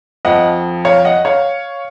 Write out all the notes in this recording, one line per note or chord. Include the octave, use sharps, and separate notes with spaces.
F2 F3 D#5 F#5
C#5 F5
D#5 F#5
C#5 F5